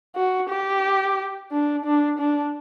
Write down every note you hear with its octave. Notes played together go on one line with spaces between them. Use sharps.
F#4
G4
D4
D4
D4